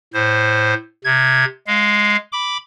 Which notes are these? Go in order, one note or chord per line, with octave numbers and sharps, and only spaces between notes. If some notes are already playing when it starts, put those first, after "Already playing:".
A2 C5
C3 G#6
G#3 F5
B5 D6